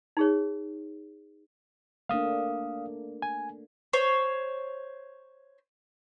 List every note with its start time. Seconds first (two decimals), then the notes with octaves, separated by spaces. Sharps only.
0.17 D#4 G#4 C#5
2.09 A3 A#3 D4 F5 D#6
3.22 G#5
3.93 C5 C#5